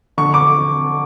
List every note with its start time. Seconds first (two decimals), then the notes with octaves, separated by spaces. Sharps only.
0.18 D3 C#6
0.34 D6